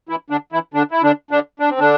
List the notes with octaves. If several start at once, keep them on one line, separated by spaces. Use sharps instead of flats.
E3 E4
D3 D4
E3 E4
D3 D4
E4
D3 D4
D3 D4
D4
C4
D3 D4